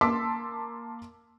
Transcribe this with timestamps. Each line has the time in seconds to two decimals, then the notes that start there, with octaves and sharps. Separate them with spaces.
0.01 A#3 A5 C6 D6 E6 B6